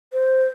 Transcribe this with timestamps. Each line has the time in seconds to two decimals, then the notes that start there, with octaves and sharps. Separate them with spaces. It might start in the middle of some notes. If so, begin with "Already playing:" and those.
0.13 C5